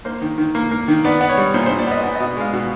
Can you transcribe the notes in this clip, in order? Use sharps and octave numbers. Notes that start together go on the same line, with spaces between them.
A#3 C5
D#3
D#3
A#3
A#3
D#3
B3 D5
B3
C#5
G3
A#2 C5
A#2 C5
D5
B3 D#5
B3 D5
B2 D#5
G#3 F5
B2